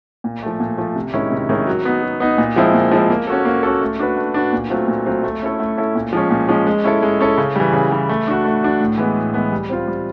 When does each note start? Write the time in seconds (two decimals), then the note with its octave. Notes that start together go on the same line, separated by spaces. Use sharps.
0.24 A#2
0.43 F3 A3
0.60 A#2
0.78 F3 A3
0.96 C3
1.14 D#3 G#3 C#4 E4
1.32 C3
1.49 D#3 G#3 C#4 E4
1.67 F#3
1.85 B3 D#4
2.02 F#3
2.20 B3 D#4
2.38 A#2
2.56 F3 G#3 C4 E4
2.74 A#2
2.91 F3 G#3 C4 E4
3.10 A#3
3.27 C#4 F#4 A4
3.45 A#3
3.63 C#4 F#4 A4
3.82 A3
3.99 D4 F#4 B4
4.17 A3
4.34 D4 F#4 B4
4.53 A#2
4.70 F#3 A3 C4 F4
4.88 A#2
5.06 F#3 A3 C4 F4
5.23 A3
5.42 C#4 E4 A4
5.60 A3
5.77 C#4 E4 A4
5.95 A#2
6.13 F3 G#3 C#4
6.31 A#2
6.48 F3 G#3 C#4
6.67 G#3
6.84 C#4 E4 A4
7.02 G#3
7.21 C#4 E4 A4
7.38 C#3
7.56 E3 G3
7.73 C#3
7.91 E3 G3
8.09 A3
8.27 D4 F#4
8.45 A3
8.63 D4 F#4
8.80 A2
8.98 E3 G#3 B3
9.16 A2
9.34 E3 G#3 B3
9.52 G3
9.70 C4 F4
9.87 G3